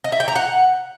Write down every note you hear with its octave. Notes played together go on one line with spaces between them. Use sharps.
D#5
E5
G5
A#5
F#5